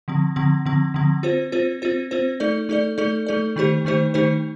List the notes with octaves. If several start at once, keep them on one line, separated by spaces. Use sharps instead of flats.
D3 F3 C4
D3 F3 C4
D3 F3 C4
D3 F3 C4
C4 F4 C5
C4 F4 C5
C4 F4 C5
C4 F4 C5
A3 D#4 A4 D5
A3 D#4 A4 D5
A3 D#4 A4 D5
A3 D#4 A4 D5
D#3 A3 D#4 G4 C5
D#3 A3 D#4 G4 C5
D#3 A3 D#4 G4 C5